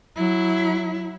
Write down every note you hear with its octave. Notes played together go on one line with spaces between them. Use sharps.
F#3 E4